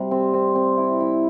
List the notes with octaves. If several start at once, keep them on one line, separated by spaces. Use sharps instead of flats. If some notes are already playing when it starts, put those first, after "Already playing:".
Already playing: C3 G3
C4
C4
C4
E4
E4